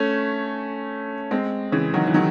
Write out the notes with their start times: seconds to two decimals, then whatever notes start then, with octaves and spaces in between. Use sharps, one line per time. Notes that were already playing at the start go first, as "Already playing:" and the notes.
Already playing: A3 C#4
1.31 G#3 C4
1.72 C#3 E3
1.93 D#3 F#3
2.07 E3
2.14 D#3 F#3